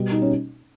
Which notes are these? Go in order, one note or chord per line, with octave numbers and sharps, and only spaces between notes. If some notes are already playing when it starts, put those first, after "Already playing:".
Already playing: B2 G3
D#4
C#4